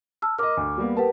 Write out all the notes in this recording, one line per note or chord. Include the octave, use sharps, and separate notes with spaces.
A5 E6 F6
A#4 D#5 D6 F6
D2
G3 A#3 B3
G4 A#4 B4 F#5 A5